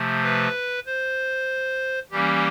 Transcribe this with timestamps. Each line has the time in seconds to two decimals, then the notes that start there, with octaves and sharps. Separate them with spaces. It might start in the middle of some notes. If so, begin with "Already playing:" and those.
Already playing: C3 F3 A3
0.23 B4
0.87 C5
2.11 E3 G3 A#3 C#4 G4